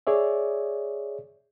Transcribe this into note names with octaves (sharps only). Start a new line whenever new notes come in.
G#4 C#5 D5 E5